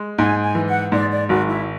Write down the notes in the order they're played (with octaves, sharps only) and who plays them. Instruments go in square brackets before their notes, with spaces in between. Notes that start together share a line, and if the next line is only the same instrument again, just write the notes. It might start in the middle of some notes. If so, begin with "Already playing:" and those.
Already playing: [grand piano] G#3
[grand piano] G#2 [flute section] G#5
[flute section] G#5
[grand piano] E3
[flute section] F#5
[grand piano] G#2 [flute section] D5
[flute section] D5
[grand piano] G#1 [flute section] F#4
[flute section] E4